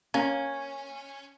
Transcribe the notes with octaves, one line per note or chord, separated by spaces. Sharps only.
A#3 C#4